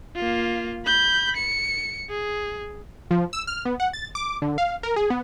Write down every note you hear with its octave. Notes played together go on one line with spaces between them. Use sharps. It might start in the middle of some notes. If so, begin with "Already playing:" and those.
A#3 F4
B5 G6
C#7
G#4
F3
E6
F6
B3
F#5
A6
D6
D3
F5
A#4
G#4
B3